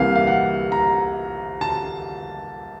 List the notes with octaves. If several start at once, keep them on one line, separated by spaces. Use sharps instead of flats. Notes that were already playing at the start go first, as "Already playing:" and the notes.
Already playing: C2 C3 E3 G3 A#3 F5
F5
F#5
A#5
A5